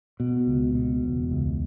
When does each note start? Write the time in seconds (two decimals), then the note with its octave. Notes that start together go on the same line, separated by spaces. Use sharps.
0.20 B2
0.48 C#2
0.75 B2
1.03 E1
1.31 C#2